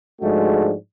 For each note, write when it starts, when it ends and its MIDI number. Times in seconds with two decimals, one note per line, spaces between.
0.22 0.74 44
0.22 0.74 53
0.22 0.74 56
0.22 0.74 57
0.22 0.74 62
0.22 0.74 66